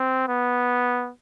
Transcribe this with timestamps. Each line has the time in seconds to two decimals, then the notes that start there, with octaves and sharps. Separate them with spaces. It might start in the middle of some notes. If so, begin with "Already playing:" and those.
Already playing: C4
0.28 B3